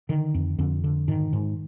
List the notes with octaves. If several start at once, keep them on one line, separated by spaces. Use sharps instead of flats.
D3 D#3
F2
F2 D3
D3
G#2 D#3
G#2